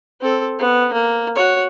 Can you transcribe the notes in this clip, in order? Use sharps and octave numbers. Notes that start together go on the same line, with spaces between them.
C4 A4
B3
A#3
F#4 C#5